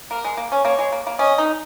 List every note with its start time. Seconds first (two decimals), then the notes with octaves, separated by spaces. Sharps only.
0.11 A#3 A#4
0.25 G#3
0.37 A#3
0.52 C#4
0.65 A#3 C#5
0.79 G#3
0.92 A#3
1.07 A#3
1.19 C#4 D#5
1.38 D#4